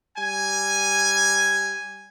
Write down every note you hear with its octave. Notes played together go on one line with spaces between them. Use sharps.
G3 G#5